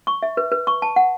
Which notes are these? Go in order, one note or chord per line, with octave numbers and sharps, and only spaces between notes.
C#6
E5
B4
B4
C#6
A5
F#5